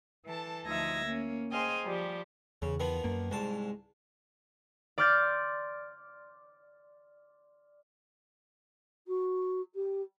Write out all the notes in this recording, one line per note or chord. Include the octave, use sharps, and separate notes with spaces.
E3 A4 A5
D2 F3 D#4 E5 G#6 A#6
A#3 C#4
G#4 C5 D#5 F5 G5 G#5
F3 G3 G4
E2 C#3
D#3 F3 B3
F#2 A#3
C2 G#2 G#3 A5
D5 C6 D6 F6 G6 A6
F#4
G4